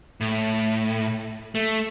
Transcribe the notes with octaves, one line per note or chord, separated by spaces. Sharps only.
A2
A3